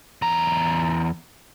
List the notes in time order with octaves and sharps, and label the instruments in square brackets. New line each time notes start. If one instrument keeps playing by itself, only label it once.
[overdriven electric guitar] E2 A#5